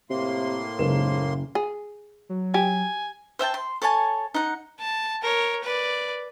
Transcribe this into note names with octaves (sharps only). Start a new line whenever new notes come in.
A2 C3 A#3 C6
F#1 G#2 A#4 E7
G#4
F#3
G4 G#5
C5 E5 G5 A5
C6
A4 C#5 G#5 A5
D#4 F#5
A5
A#4 C#5
B4 D5